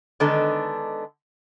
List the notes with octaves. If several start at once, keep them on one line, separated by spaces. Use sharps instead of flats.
D3 D#3 G#3 B3 D4 A4